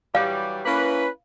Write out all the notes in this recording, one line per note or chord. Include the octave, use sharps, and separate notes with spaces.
E3 F#3 G3 F5
A#3 C#4 E4 B4